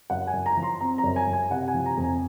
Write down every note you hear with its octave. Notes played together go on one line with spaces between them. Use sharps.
F#2 F#5
G#5
F#2
A#5
F3
C6
C4 A#5
A#5
F#2
G#5
F#2
G#5
C3 F#5
G#5
F3
A#5
F2
G#5